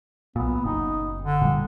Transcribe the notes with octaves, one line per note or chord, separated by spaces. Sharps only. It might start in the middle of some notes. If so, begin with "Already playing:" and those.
B1 A#2 B3
F#1 D#4
D3
A#2 G3